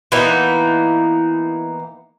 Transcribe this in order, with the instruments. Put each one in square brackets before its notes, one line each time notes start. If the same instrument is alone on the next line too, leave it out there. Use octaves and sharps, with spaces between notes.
[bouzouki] E3 A#3 B3 D#4